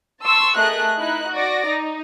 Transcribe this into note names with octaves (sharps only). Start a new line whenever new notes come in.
A5 C6 C#6 E6
A3 G#4 A#4 D#5 F#6
D#4 E4 F#6
F#4 D5 A#6
D#4